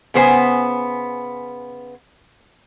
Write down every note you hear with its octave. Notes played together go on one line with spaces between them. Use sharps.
C#3 B3 C5 G#5